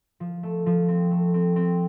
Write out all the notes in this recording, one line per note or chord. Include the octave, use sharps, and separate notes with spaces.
F3
A3
F3
C4
A3
C4
C4